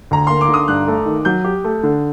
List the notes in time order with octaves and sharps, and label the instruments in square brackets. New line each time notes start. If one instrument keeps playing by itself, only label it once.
[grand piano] D2 [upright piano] A#5
[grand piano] A#3 [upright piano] C6
[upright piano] D6
[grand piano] D3
[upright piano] D#6
[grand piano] G2 [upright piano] F#6
[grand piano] A3
D#3
[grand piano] F#3 [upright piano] G6
[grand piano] G4
A3
D3